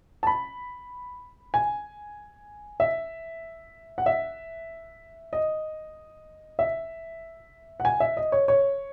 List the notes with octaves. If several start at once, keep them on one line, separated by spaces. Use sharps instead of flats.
A5
B5
G#5
E5
F#5
E5
D#5
E5
F#5
G#5
E5
D#5
C#5
C#5